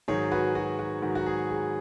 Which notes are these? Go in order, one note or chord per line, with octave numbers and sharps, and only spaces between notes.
G#2 D#3 F#3 G#4 C#5
F#4 B4
F#4
F#4
G#2 D#3 F#3 F#4
F#4
G#4
G#4